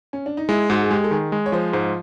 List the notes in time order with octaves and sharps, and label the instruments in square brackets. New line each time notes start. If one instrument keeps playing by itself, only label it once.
[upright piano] C#4
D4
D#4
[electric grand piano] G#3 [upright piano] E4
[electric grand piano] G#2 [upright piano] F#4
[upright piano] G#4
[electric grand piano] G#3 [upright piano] G4
[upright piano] A4
[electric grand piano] D#3 [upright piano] G#4
[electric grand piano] G#3
[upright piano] C#5
[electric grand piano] F3 [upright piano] C5
[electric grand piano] G#2 [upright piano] C5